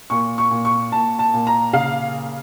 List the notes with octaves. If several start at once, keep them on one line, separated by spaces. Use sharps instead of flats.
A#2 C#6
C#6
A#2
C#6
A#2 A5
A5
A#2
A#5
C#3 F5